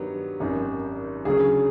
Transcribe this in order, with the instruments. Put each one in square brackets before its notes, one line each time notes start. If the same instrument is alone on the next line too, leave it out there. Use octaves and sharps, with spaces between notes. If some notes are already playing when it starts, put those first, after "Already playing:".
Already playing: [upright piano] G2 D#3 F#3 B3 [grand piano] G4
[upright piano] G#1 F#2 D#3
[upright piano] D2 C#3 F#3 [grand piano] G#4